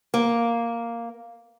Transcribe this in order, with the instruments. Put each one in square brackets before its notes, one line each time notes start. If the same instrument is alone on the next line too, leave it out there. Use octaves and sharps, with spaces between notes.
[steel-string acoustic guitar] A#3